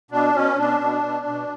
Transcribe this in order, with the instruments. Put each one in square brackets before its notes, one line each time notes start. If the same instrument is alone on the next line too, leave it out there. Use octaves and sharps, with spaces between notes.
[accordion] B2 D4
B2 C#4
B2 D4
B2
B2
B2